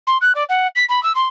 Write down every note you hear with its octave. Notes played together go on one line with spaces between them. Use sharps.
C6
F#6
D5
F#5
B6
B5
E6
C6